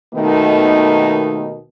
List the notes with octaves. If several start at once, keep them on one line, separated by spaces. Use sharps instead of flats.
D#2 B2 D#3 A3 B3 D#4